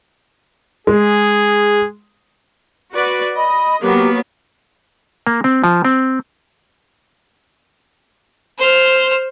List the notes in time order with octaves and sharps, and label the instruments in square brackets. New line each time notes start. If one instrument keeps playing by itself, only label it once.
[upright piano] G#3 [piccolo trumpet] G#4
[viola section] F#4 B4 D5
[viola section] D#5 [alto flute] B5
[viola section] F#3 A#3 B3 [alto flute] G4
[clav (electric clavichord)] A#3
C4
F3
C4
[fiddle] C5 F6